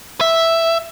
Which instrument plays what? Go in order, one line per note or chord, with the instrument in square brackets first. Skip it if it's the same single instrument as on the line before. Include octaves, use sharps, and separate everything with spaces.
[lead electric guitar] E5